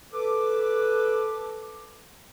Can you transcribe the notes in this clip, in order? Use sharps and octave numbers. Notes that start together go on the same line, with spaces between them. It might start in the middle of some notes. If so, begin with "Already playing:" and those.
A4 B4 D6